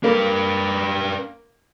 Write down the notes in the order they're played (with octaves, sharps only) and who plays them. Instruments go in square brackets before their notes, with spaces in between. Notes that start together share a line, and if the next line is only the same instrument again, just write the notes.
[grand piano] A#3 [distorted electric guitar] D4 B4